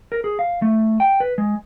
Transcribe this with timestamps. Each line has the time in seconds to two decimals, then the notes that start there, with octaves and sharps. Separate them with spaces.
0.12 A#4
0.24 G#4
0.39 F5
0.62 A3
1.00 G5
1.20 B4
1.38 G#3